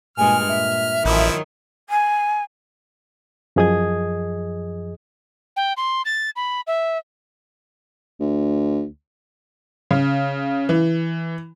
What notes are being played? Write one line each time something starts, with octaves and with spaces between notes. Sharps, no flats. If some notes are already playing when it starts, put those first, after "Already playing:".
G2 A#2 G#3 G#5 F6
A#2 E5
A1 D#3 F3 F#3 E4
G#5
F#2 F3 G#4 D#5 D#6 G#6
G5
C6
A6
B5
E5
D2
C#3
E3